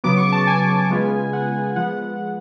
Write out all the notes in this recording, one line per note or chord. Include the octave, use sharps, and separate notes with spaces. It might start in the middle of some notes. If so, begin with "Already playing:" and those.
C#3 F#3 B3 D6
C#6
A5
G#5
C#3 G#3 B3 F4
F#5
F3 G#3 B3 F#5